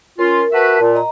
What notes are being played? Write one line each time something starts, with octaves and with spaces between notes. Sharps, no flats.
C#4 F4 A#4
F#4 A#4 B4 E5 A5
A#2
D#5 A#5